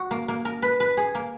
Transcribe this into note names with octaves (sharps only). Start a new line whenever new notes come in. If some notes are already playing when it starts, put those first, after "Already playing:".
Already playing: F#4
A#3
A#3
A#4
B4
B4
G#4
A#3